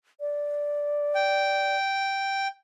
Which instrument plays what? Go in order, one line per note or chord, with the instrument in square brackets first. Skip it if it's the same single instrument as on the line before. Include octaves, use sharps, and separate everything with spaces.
[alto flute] D5
[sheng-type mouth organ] G5